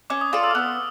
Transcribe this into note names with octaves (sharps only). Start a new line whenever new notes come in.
C#4 D6
D#6
F4 A4 D5 D#6
E6
F6
B3 E6